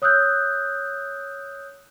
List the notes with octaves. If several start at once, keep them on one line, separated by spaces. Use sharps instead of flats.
C#5 D#6 E6 F#6 G6